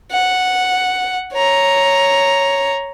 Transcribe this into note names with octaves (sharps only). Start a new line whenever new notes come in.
F#5
C#5 A#5